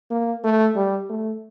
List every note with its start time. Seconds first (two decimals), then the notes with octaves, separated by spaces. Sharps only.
0.10 A#3
0.44 A3
0.76 G3
1.09 A3